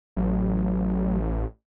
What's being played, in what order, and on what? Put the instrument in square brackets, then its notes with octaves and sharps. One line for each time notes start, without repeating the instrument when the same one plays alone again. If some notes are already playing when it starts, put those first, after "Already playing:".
[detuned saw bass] A1 [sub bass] F#3